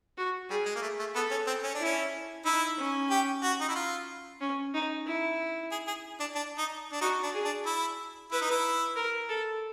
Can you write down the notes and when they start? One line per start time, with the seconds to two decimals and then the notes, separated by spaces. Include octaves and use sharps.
0.18 F#4
0.50 G3 G#4
0.66 G#3
0.75 A#3
0.82 A3
0.99 A3
1.15 B3 A4
1.31 C#4
1.47 C4
1.63 C#4
1.75 D4
1.81 C#4 E4
2.45 D#4 E4
2.77 C#4
3.10 G4
3.42 F#4
3.61 D#4
3.69 E4
3.75 F4
4.41 C#4
4.74 D#4
5.06 E4
5.71 G#4
5.87 G#4
6.20 D4
6.35 D4
6.58 D#4
6.92 D4
7.01 D#4 F#4
7.23 D4
7.34 G#4
7.45 D4
7.66 E4
8.32 E4 B4
8.41 D#4
8.51 E4
8.96 A#4
9.29 A4